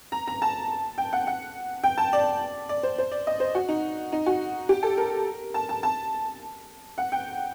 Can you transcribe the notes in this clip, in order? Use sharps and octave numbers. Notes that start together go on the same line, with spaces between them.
A#5
A#5
A5
G5
F#5
F#5
G5
A5
D5
D5
C5
C5
D5
D#5
C5
F#4
D#4
D#4
F#4
G4
A4
A#4
A5
A5
A5
F#5
G5